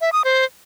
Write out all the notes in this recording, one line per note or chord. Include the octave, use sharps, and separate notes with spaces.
E5
D#6
C5